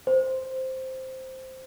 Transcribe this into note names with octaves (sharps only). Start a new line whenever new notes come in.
C5